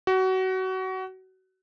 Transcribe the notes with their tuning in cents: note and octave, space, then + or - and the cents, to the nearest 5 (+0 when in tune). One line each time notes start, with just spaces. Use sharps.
F#4 +25